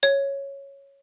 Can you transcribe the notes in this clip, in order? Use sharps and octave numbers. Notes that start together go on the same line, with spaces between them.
C#5